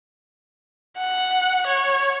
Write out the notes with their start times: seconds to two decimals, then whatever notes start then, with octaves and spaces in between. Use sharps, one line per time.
0.98 F#5
1.67 C#5